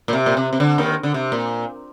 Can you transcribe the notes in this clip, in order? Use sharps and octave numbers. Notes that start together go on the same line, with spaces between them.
A#2
C3
A#2
C3
C3
D3
D#2 D#3
D3
C3
A#2